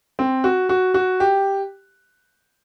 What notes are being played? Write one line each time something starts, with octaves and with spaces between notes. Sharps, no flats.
C4
F#4
F#4
F#4
G4